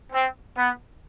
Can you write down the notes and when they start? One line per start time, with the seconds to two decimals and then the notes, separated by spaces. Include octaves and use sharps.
0.12 C4
0.56 B3